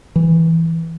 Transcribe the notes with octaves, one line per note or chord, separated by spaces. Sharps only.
E3